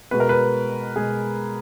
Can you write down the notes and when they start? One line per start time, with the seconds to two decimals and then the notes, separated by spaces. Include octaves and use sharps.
0.11 B2 G#3 B4
0.20 A#4
0.29 B4
0.96 B2 G#3 G#4